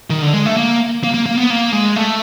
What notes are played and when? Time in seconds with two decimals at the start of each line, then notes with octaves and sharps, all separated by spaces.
0.10 D#3
0.22 D3
0.33 G#3
0.46 A3
0.57 A#3
1.04 A#3
1.14 A#3
1.26 A#3
1.37 B3
1.50 A#3
1.73 G#3
1.96 A3